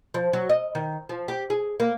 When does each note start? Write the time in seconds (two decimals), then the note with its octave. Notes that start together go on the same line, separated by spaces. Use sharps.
0.14 F3
0.33 F#3
0.49 D#5
0.75 D#3
1.09 F3
1.28 G4
1.50 G#4
1.80 A#3